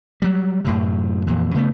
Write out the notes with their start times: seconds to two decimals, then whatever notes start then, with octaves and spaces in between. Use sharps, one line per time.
0.22 F#3 G3
0.64 F#2 A2 C3
1.27 F2 A#2 E3
1.54 C#3 A3 B3